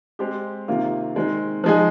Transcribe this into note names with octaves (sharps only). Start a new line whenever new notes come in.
G#3 C4 G4
C3 D#3 A#3 F4
D#3 G#3 C4
F3 G#3 D#4 G#4